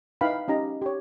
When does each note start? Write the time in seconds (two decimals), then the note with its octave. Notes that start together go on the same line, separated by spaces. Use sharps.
0.21 D#4 E4 B4 F5 G5 B5
0.48 C#4 D#4 G4 D#5 A#5
0.82 G4 C#5